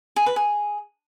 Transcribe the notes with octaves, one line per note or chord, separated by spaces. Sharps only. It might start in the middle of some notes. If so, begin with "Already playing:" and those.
G#4
B4
G#4